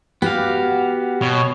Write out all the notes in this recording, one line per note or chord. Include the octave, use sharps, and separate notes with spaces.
B3 F#4 G4 F5
B2 C#5